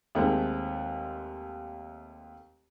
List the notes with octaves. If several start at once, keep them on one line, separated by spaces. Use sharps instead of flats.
D#2 G#3 A3 C4